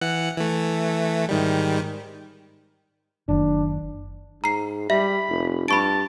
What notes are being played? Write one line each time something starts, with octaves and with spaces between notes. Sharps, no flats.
E3 F#5 F#6
E3 A3
G#2 D#3 G3
F#1 D#3 D4
G#2 A#5 C7
G3 E5 B5
F1
G2 A5 B5 C#6 D7